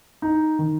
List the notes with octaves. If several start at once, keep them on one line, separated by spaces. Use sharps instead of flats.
D#4
D#3